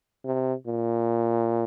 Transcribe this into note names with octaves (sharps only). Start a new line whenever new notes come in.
C3
A#2